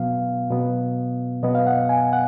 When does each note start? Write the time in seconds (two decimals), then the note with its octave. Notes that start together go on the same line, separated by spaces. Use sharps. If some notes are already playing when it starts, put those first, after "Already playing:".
Already playing: B2 F#3 B3 F5
0.51 B2 F#3 B3
1.43 B2 F#3 B3 D#5
1.55 F5
1.67 F#5
1.89 G#5
2.13 F#5